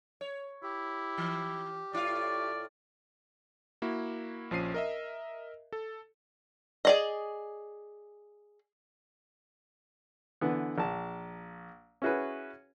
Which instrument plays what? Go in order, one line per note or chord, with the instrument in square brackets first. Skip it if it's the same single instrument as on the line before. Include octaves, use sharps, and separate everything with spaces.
[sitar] C#5
[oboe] E4 [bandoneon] G4
[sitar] E3
[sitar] A2 E4 F4 [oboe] D5
[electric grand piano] A#3 E4 F#4
A#1 F3 C#4 C7 D#7
A#4 D#5 E5
A4
[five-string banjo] G#4 D5 D#5
[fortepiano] D3 E3 B3
A#1 A5
C#4 E4 F#4 G#4 B4